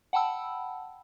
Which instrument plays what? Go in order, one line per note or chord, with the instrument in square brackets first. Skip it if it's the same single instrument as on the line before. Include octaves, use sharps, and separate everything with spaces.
[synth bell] F#5 G5 A5 B5 E6